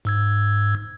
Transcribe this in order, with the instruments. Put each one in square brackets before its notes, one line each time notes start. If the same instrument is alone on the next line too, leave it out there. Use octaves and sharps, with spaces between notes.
[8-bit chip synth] G#2 E6 G#6